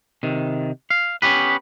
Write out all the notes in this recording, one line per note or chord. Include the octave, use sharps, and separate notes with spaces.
C3 D#3
F5
B3 C#4 F#4 G4 B4